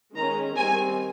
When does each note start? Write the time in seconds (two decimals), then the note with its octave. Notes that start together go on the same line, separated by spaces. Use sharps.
0.16 D#3 G#3 C#4 A#5
0.56 D#3 G3 C4 G#5